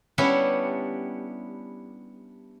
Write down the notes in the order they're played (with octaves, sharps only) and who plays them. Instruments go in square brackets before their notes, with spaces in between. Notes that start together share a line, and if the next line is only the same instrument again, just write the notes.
[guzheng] G3 B3 C#4 D4 E4 G4